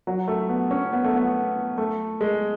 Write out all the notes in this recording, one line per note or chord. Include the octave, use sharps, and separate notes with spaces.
F#3
A3
B3
C#4
B3
A3
B3
A3
G#3